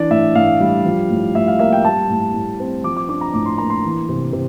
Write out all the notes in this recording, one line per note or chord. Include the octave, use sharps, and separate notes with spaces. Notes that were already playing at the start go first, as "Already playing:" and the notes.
Already playing: E3 D4 D5
A2 E5
A2 F5
G3
F3
A2
A2 E5
F5
A#3 E5
G5
G3 A5
A2
A2
C4
F3 D6
D6
D4 D6
A#5
A2 D6
C6
A#3 A#5
C6
E3
C3
C3